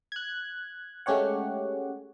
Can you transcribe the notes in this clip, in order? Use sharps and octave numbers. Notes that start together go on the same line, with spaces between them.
F#6 G#6
G#3 A3 C#4 G4 C#5 F#5